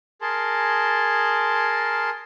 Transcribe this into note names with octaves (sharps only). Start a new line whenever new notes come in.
G#4 A#4 A5 C6